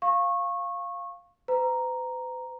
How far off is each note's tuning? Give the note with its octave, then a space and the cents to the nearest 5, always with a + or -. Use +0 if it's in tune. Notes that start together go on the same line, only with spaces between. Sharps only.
F5 +0 C#6 -20
B4 +45 A#5 +0